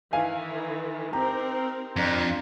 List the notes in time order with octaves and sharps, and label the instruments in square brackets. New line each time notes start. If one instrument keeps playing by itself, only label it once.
[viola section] D#3 E3 [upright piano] F5 G#5
[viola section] C4 D#4 A#4 [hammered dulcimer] G4 [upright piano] A#5
[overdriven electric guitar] F2 [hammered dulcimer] D4 A#4